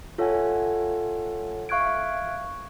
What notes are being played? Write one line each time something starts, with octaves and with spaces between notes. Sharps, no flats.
F4 A4 C#5 E5 F#5 G#5
E5 F5 C#6 F#6 G#6 D7